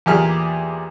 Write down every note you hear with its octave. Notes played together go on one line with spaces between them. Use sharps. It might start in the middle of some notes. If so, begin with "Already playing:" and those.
E2 A#2 G4 G#4 D5 F6